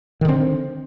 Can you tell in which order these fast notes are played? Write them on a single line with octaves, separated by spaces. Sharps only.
D#3 D3 C4